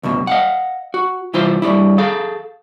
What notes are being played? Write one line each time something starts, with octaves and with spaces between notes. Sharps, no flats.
C#2 F#2 B2
D#5 F5 F#5
F#4
C2 E3 E4 F4 C5 C6
G2 F3 G3 E4
G#4 A4 F5